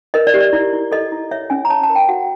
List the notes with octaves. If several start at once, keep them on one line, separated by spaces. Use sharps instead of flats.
A#4 D#5
D5
G4
D5
E4 D5
E4
A4 D#5
E4
C#5 E5
C#4 G#5
A#5
C#5 A5
A5
A#4
G5
F#4 F#5